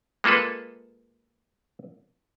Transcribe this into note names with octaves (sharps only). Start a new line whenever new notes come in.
G#3 A#3 F4 A4 B4